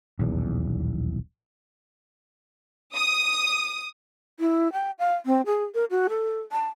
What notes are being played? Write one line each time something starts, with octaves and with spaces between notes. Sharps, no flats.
D#1 B1 E2
D#6
E4
G5
F5
C4
G#4
A#4
F#4
A4
A5